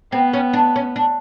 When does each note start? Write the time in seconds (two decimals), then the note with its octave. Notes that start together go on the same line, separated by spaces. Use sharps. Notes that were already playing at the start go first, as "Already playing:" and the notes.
0.12 B3 C4
0.33 C#4
0.53 D4
0.76 C#4
0.96 D4